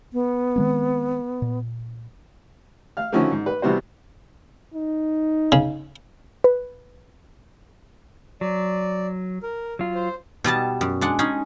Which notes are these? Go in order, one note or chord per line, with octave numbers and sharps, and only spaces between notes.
B3
D#3 G#3 C4
A#2
F5 F6
D3 D#3 F3 C#4 E4 F#4
G#2
B4
C3 E3 G3 B3 F#4 C5
D#4
C#3
B4
F#3 D5
A#4
F#3 F4
C5
B2 G3 D#5 A5
F#2
G#3 D4 F#5
C#4 D#4 G#4